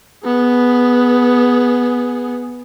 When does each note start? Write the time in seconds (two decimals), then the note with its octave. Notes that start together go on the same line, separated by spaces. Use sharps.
0.24 B3 G#4